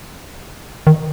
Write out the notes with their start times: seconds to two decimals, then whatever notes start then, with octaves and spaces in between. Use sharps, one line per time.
0.87 D#3